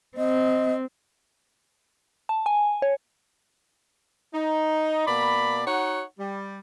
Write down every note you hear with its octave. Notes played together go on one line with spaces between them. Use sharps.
C4 D#5
A5
G#5
C#5
D#4
B2 A#3 D5 B5
D#4 F#4 C#5 F#5
G3